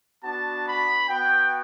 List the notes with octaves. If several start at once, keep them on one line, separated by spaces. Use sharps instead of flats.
B3 D4 F#4 A5
B5
B3 F#4 G5